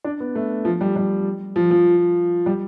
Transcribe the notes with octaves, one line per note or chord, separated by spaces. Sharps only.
D4
B3
A3
F3
G3
G3
F3
F3
G3